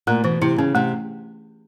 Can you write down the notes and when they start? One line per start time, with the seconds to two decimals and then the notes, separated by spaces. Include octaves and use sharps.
0.07 A#2 A3
0.24 B2 E3
0.41 C3 E4
0.58 C#3 C#4
0.75 C3 A3